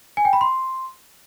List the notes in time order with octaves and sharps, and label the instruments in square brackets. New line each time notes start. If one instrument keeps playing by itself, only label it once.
[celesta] G#5
G5
B5
C6